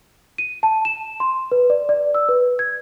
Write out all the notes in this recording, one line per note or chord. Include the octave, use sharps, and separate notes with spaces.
D#7
A5
E7
C6
B4
D5
D5
E6
B4
G#6